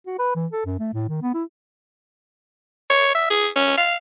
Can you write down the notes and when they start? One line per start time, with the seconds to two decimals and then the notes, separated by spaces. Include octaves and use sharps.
0.07 F#4
0.19 B4
0.36 E3
0.52 A4
0.66 F#2
0.79 A3
0.93 A2
1.09 D#3
1.22 B3
1.34 E4
2.90 C#5
3.15 E5
3.30 G#4
3.56 C#4
3.77 F5